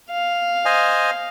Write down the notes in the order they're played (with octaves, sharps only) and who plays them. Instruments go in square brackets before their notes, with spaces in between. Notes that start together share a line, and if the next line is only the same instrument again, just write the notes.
[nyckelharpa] F5
[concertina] C5 D#5 G#5